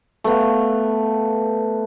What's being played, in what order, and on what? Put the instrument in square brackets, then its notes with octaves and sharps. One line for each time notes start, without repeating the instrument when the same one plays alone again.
[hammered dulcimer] A3 B3 F5